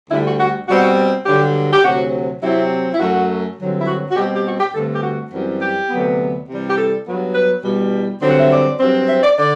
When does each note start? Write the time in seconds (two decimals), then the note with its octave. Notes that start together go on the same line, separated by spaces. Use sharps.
0.10 D2 D3 G3 E4
0.25 F#4
0.40 F#4
0.68 B2 G3 C4 F#4
1.26 G2 D3 F#3 G4
1.73 G4
1.84 D2 C3 F#3 F#4
2.43 C3 F#3 C4 E4
2.94 E4
3.00 F#2 F#3 A3 F#4
3.58 G2 D3 F#3 C4
3.79 E4
3.87 F#4
4.11 F#4
4.16 B2 G3 C4 G4
4.34 G4
4.45 F#4
4.60 G4
4.74 G2 D3 A3 C4 A4
4.95 G4
5.03 F#4
5.32 F#2 E3 G3 C4
5.61 G4
5.90 D2 C3 F#3 B3
6.48 C3 E3 G3
6.70 G4
6.77 A4
7.06 G2 F#3 B3
7.35 B4
7.64 E2 B2 G3
8.21 G2 D3 F#3 C4
8.30 F#5
8.40 E5
8.52 D5
8.80 G2 F#3 C4
9.09 E5
9.23 D5
9.38 D3 D5